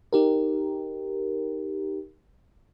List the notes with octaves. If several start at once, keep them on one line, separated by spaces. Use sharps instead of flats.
D#4 G4 A#4